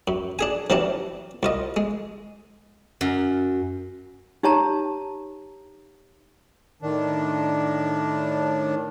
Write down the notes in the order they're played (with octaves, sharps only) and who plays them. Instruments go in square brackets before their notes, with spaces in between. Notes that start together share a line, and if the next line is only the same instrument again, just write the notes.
[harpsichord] F#2
D4 G#4 G#5
C3 E3 F#3 C#4 D4
C2 F4 D#5
G#3
[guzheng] F#2
[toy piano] D#4 G4 C#5 A5 A#5
[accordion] A2 D#3 D4